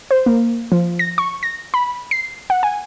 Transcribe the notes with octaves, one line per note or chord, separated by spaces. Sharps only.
C5
A#3
F3
A#6
C#6
A#6
B5
C7
F#5
G#5